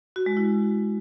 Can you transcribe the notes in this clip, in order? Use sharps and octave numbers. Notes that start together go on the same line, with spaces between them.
F#4
G#3
E4